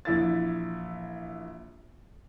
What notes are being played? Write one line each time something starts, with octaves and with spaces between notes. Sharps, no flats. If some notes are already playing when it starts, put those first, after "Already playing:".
A#1 E3 E4 E5 A6